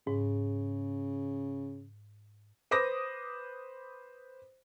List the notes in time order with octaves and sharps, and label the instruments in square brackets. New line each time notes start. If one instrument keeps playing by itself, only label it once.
[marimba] G#2 [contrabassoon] C#3
[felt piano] B4 C5 D6 D#6 A#6